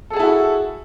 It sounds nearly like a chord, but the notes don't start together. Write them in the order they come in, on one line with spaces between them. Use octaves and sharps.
A4 G#4 A5 E4 F#4